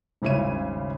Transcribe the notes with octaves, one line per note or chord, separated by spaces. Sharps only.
D#1 G#1 C#3 E4 C#5 D#7